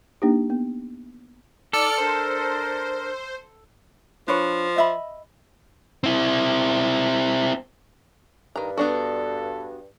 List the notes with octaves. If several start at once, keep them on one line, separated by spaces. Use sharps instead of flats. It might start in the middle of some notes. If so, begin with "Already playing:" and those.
A#3 D4 D#4 G4
B3
D#4 A4 D5 D6 F6 C#7
D4 A#4 C5
F3 D4 B4 C#5
D#5 E5 B5
C4 E4
G2 D#3 A#5
B3 D4 F#4 A4